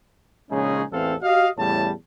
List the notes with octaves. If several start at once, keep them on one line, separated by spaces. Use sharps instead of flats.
A#1 C#3 G#3 C#4 D#4 G#4
A1 E2 E3 C4 A4 F5
F#4 G4 D#5 F5
E2 A2 C#3 G3 A5